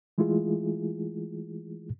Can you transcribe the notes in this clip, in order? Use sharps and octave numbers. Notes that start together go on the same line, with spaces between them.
E3 G#3 A3 E4 F4 G#4